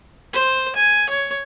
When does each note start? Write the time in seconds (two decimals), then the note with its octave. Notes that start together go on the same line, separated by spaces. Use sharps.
0.33 C5
0.76 G#5
1.09 C#5